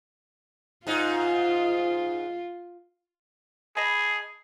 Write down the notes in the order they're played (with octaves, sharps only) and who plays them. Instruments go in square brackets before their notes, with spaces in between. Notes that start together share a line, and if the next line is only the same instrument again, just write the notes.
[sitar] G#2 D#4 [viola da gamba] F4
[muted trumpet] G#4 [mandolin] D#5 A5 B5